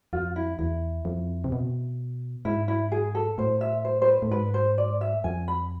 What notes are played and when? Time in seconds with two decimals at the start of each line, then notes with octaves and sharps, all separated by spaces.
0.13 F2 F4
0.36 E4
0.59 E2 E4
1.05 F2
1.44 C3
1.52 B2
2.45 G#2 E4
2.68 E4
2.92 G#4
3.15 A4
3.38 A2 C5
3.61 E5
3.85 C5
4.02 C5
4.08 B4
4.22 A2
4.31 G#2 B4
4.54 C5
4.78 D5
5.01 E5
5.24 F2 G#5
5.48 B5